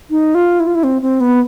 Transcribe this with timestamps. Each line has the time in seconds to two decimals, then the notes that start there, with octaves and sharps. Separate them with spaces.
0.11 D#4
0.35 F4
0.60 E4
0.67 F4
0.75 E4
0.84 C4
1.02 C4
1.21 B3